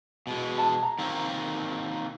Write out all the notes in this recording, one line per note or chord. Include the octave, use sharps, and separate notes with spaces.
B2 G#3
A5
A#5
D#3 A#3 C4